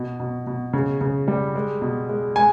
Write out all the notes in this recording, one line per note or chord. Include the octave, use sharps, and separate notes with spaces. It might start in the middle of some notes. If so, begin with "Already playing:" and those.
Already playing: B2
B2
B2
C#3
C#3
G3
G#3
B2
G#3
G#3 G#5